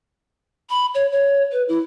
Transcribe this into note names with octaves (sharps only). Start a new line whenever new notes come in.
B5
C#5
C#5
B4
E4